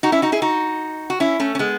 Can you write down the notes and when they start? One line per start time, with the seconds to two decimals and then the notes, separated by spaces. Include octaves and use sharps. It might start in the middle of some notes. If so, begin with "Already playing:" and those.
0.03 D#4 F#4
0.12 C#4 E4
0.22 D#4 F#4
0.32 E4 G#4
0.42 D#4 F#4
1.10 F#4
1.20 C#4 E4
1.40 A3 C#4
1.55 C#4
1.59 G#3 B3